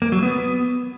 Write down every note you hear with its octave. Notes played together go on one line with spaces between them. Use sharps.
A#3
F#3
B3